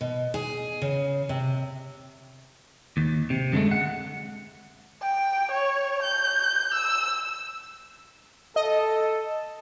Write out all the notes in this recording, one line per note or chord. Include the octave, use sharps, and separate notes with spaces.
B2
G#4
C#3
C3
D#2
C3
F#2 D3 F#3 G#3 A3
F#5
G5
C#5
G6
E6
A4 D#5